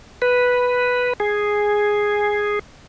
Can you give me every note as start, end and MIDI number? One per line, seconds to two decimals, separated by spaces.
0.22 1.13 71
1.20 2.59 68